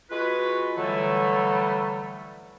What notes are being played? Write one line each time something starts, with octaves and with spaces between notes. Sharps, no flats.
G#3 F4 F#4 B4
A2 D3 E3 F#3 G3 A3